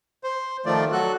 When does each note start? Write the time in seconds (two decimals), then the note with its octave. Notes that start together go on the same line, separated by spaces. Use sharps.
0.24 C5
0.66 D#3 F3 A3 F4 D5
0.92 F#3 F#4 A4 F#6